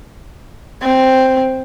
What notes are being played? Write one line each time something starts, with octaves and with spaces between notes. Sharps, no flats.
C4